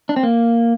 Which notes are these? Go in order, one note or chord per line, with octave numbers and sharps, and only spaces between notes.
D4
C4
A#3